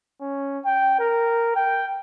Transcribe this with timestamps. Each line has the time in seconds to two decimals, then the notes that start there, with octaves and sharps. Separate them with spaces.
0.21 C#4
0.65 G5
1.00 A#4
1.55 G5